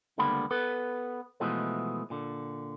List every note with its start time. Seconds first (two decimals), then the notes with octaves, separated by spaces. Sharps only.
0.18 C#2 D3 G3 A#3 B3 B5
0.51 B3 A4 B4
1.40 B2 E3 F3 G#3 A3 B3
2.10 A#2 D3